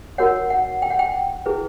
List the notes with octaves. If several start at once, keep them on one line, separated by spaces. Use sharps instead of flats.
D#4 F#4 A#4 C#5 F#5
F#5
G5
F#5
G5
E4 G#4 B4